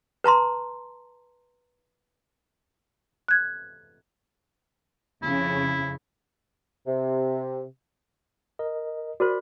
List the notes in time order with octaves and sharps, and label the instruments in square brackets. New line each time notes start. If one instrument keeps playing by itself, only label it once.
[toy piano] B4 A5 A#5 C6
[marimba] F#6 G#6
[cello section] F2 C#3 [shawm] E4
[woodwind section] C3
[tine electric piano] A#4 D#5
[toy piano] F#4 A#4 C5 [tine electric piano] D5 B5